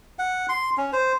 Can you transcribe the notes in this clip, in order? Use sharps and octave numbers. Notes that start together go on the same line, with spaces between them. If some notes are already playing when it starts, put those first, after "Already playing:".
F#5
C6
C#4
C5